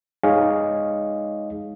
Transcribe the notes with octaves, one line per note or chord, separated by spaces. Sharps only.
G#3 D#4 G#4 C#5 D#5 F5